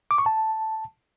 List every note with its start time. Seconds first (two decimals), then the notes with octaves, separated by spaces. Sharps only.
0.11 D6
0.18 C#6
0.26 A5